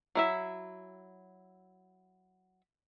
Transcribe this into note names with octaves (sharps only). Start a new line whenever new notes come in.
F#3 E4 E5